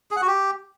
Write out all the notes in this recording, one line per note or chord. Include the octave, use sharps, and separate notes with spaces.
G#4
F#5
F#4
G4